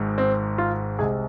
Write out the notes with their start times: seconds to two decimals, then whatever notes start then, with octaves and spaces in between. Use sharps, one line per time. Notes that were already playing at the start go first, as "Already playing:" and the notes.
Already playing: G#1 G#2 G#3
0.18 C4
0.58 F4
0.98 C2 C3 G#3 G#4